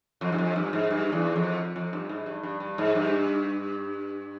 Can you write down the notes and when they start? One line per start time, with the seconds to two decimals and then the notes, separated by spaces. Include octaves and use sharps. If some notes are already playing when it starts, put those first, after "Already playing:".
0.21 F2
0.32 G2
0.38 F2
0.56 G2
0.73 G#2
0.90 G2
1.12 E2
1.36 F2
1.76 F2
1.93 G2
2.09 G#2
2.26 G2
2.43 G2
2.60 G2
2.78 G#2
2.95 G2